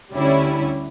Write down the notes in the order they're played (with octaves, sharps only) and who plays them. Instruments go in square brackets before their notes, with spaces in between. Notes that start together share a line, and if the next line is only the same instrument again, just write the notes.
[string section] D2 D3 G3 C#4 E4